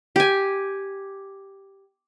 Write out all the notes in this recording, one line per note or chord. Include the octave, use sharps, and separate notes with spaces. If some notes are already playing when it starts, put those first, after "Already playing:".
G4 G#5